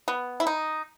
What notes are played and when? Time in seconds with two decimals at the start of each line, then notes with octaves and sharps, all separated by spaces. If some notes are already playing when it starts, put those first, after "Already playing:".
0.08 B3
0.40 E4
0.47 D#4